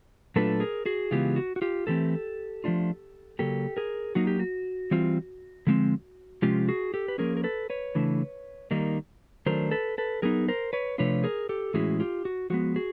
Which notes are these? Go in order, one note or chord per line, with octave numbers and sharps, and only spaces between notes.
A#2 F#3 A3 D4 F4 A4 B4
G#4 A#4
F#4 G#4
C#3 E3 G#3 B3 F4 G4
F#4
F#4
F4 G4
A2 E3 A3 C4 G4 A4
F3 A3 D4 F4
C#3 F#3 A#3 G4 A4
G#4 A#4
F#3 A#3 D#4 F#4
G4
F#4
E3 G3 C4 F4
D3 F3 G#3 C4
C3 F3 G#3 C#4 F4 G4
F#4 G#4
G4 A4
B4
F3 A#3 C#4 G#4 A#4
A#4
A4 B4
B4 C#5
C#3 E3 A3 D4
D#3 G3 A#3 D#4
D#3 F#3 A3 D4 A#4 C5
A4 B4
A4 B4
F#3 B3 D#4 G#4 A#4
A#4 C5
B4 C#5
C3 F3 A3 D4 F4 B4 C#5
G#4 A#4
G4 A4
A2 E3 G#3 C#4 E4 F#4 G#4
F4 G4
F#4
F3 G#3 B3 F#4
F#4 G#4